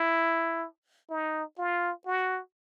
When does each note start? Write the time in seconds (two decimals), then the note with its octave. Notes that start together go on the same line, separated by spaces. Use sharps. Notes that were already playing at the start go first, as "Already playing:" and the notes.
Already playing: E4
1.10 D#4
1.58 F4
2.06 F#4